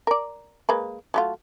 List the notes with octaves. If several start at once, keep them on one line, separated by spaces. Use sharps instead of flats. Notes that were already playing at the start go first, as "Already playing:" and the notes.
A#4 D5
G#3 A#3 B4
F#3 A3 F4